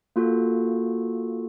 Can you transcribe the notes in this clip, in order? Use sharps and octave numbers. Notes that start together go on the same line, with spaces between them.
A#3 F4 F#4 A4